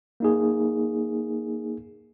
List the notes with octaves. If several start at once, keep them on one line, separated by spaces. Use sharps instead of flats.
A#3 D#4 G#4